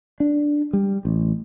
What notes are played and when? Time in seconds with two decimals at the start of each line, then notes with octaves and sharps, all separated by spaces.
0.20 D4
0.73 G3
1.05 A1